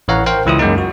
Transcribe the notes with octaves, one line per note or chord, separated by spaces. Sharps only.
A1 E3 C#5 F5 F#5 A#5
A#4 C5 F5 G5
C#2 E3 E4 F4 D#6
F#2 G#3 A#3 D#4
F#4